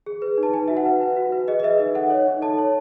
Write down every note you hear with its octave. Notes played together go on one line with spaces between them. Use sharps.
G#4
B4
D#4
A5
B4 G#5
F#4 E5
F#5
B4
B4
F#4
B4
G#4 D#5
D#5
B4 E5
D#4 E5
A4 F#5
C#5
D#4
A4 A5
C#5